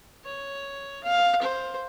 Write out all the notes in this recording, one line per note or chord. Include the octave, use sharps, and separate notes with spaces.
C#5
F5
C5